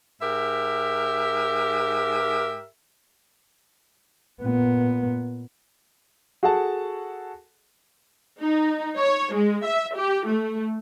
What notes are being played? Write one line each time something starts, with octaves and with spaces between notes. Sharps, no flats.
G#2 G4 A#4 E5
A#2 B3
F#4 G#4 A4 F#5 A5
D#4
C#5
G#3
E5
G4
A3